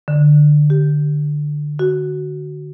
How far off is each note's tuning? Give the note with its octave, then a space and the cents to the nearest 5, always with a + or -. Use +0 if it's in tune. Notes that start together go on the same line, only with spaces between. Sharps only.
D3 +15
G4 -5
F#4 +5